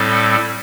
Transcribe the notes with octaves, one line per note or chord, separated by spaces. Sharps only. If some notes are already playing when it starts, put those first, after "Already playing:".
Already playing: A2 G3 C4 A4